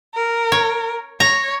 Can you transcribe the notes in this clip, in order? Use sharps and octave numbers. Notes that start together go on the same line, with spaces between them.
A#4
C#5
C#5 A#5